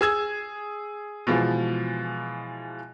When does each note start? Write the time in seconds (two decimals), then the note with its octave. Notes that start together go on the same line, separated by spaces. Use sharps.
0.01 G#4 E6 G#6
1.27 B2 E3 F3 G#3